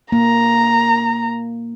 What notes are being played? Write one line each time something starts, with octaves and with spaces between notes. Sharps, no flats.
A#3 A#5